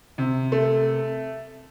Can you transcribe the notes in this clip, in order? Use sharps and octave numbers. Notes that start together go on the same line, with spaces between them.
C3
A3